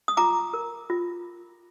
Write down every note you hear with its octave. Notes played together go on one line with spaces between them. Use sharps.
D#6
F4 A#5 D6
A#4
F4